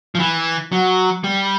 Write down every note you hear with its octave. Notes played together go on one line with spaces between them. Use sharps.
F3
E3
F#3
G3